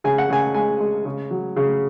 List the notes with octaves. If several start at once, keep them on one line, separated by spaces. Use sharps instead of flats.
C#3 G#5
F#5
C#3 G#5
G#3 G#5
G#3
C#3
F#3
C#3